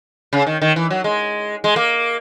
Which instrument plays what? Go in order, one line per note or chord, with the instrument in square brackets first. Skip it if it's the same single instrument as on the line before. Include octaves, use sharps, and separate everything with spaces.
[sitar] C#3
D#3
D#3
E3
F#3
G#3
G#3
A#3